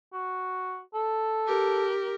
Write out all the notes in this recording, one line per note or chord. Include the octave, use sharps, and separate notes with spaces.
F#4
A4
G4 A#4